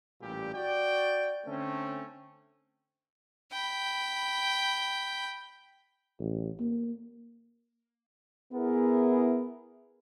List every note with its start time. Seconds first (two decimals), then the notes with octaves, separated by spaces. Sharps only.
0.21 A1 A#2 G3 G4
0.53 F#4 D5 G5
1.45 D3 A3 C4 C#4
3.52 G5 B5
6.19 A1
6.60 A#3
8.53 B3 E4 G#4 A#4